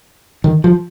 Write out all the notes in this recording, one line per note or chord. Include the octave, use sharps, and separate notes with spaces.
D#3
F3